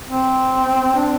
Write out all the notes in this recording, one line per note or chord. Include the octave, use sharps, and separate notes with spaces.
C4
D4